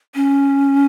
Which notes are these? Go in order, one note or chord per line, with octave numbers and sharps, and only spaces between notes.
C#4